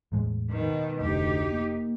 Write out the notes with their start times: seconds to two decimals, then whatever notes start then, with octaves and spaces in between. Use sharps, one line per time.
0.12 E2 A2 G#3
0.50 B2 D#3
1.01 F1 D2 D#4 G4
1.51 A#3